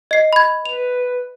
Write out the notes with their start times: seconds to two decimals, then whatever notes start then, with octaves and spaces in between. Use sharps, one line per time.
0.11 D#5 C7
0.33 B5 G#6
0.65 B4 F7